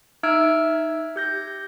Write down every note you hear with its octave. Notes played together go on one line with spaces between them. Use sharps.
D#4 E5 E6 F6 G#6 D7
G4 G6 A#6